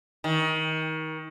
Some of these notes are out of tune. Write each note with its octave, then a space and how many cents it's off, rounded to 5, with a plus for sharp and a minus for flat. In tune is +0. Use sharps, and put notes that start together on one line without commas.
D#3 +25